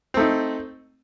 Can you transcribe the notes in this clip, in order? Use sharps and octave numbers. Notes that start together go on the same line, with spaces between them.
A3 C4 D#4